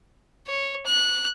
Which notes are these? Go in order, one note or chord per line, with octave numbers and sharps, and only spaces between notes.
C#5
F#6